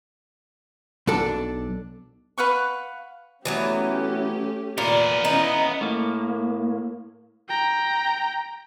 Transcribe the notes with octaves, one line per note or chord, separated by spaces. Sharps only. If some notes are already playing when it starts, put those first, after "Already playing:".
B1 D4 A4
B4 F5 F#5 C#6
E3 F#3 A3 B3 C#4 G4
A#2 B3 F5
E3 C#4 D#4 D#5
A2 A#3
G5 A#5